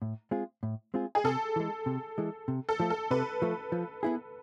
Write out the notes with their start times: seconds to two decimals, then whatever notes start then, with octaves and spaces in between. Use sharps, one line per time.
0.02 A2
0.31 G#3 C4 F4 G#4
0.63 A2
0.94 G#3 C4 F4 G#4
1.15 G#4
1.24 C3 A4
1.56 E3 G#3
1.86 C3
2.18 E3 G#3
2.48 C3
2.69 A4
2.80 F3 A3
2.90 A4
3.11 C3 B4
3.42 F3 A3
3.72 F3
4.03 B3 E4 G#4